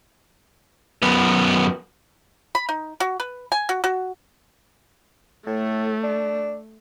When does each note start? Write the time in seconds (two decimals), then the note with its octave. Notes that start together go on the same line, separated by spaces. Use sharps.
1.02 F#2 B3
2.55 B5
2.69 D#4
3.00 F#4
3.20 B4
3.52 G#5
3.69 F#4
3.84 F#4
5.47 A2 A3
6.03 D4